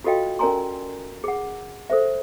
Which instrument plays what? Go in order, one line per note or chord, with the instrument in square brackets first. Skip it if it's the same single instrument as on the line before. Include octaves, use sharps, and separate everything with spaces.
[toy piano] F4 F#4 A4 D#5 F5 G5
C#4 A#4 D5 G#5 A#5 C6
G#4 F#5
A4 C5 E5